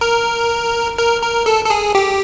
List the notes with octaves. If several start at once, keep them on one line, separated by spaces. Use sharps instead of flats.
A#4
A#4
A#4
A4
A4
G#4
G4